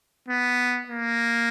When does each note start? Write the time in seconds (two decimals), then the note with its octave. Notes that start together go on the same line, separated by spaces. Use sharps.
0.28 B3
0.88 A#3